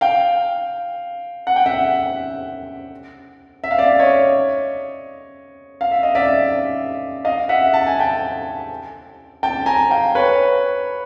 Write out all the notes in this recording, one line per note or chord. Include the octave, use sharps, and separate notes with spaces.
F5 G5
F#5
G5
E5 F#5
E5
F5
D5 E5
C#5 D#5
F5
E5
D#5
D5 E5
D#5 F5
E5 F#5
A5
G#5
G5 A5
G5 A5
G#5 A#5
F5 G5
B4 C#5